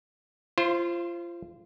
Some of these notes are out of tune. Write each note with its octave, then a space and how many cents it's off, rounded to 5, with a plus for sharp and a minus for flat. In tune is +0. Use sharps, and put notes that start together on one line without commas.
F4 -25 C5 +10